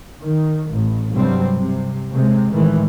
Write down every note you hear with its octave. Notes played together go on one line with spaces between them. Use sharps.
D#3
A1
G2 C3 F#3 G3 C4
C3
C3 G#3
A2 D#3 E3 G#3